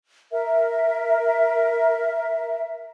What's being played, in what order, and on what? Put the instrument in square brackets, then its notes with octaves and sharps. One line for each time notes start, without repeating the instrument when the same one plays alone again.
[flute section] A#4 E5